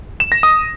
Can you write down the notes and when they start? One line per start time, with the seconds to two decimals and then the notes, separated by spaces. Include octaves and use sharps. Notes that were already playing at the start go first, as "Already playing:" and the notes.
0.20 E7
0.32 A#6
0.43 D#6